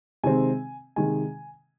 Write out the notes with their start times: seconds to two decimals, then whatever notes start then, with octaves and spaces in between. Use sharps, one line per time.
0.24 C3 D#3 G#3 C4 G#5
0.96 C3 D#3 G#3 G#5